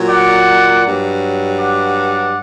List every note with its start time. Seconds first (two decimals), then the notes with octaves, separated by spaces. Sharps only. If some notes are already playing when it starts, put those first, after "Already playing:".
Already playing: A#2 F#3
0.09 D5 F#5
0.84 G2 F#3
1.59 D5 F#5